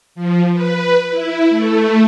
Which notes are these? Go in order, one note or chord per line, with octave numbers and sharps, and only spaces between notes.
F3
B4
E4
A3